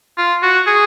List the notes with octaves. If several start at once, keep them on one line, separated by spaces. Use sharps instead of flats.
F4
F#4
G#4